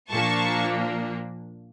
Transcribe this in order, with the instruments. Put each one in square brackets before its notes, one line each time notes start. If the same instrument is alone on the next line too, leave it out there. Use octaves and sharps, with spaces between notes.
[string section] A#2 F3 A#3 D4 A5 C#6